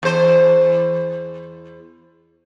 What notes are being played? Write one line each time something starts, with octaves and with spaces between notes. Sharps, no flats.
E2 C5